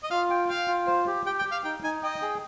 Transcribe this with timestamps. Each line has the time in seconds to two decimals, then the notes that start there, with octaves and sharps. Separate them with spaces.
0.03 D#5
0.10 F4 F5
0.30 G5
0.49 F5 G5
0.68 F4
0.87 C5
1.07 G4
1.26 G4 G5
1.39 G5
1.45 G4
1.51 F5
1.64 D#4 G5
1.83 D#4 G#5
2.03 D#5 G5
2.22 G#4